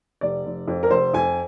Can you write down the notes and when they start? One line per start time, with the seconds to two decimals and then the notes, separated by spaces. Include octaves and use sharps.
0.21 F1 D5
0.46 F1
0.68 F2
0.83 A#4
0.91 F1 C5
1.14 F2 G#5